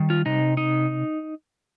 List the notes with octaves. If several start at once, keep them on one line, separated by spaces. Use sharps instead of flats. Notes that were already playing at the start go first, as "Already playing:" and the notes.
Already playing: D#3 G3
F4
C3 D#4
D#4